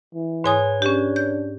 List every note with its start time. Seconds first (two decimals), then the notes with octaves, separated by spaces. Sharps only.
0.14 E3
0.44 G#2 B4 C#5 G#5 D#6
0.82 C#4 D4 G4
1.16 G6